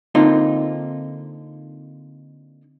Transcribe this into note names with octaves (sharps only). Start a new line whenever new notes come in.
D3 A#3 C4 D#4 F4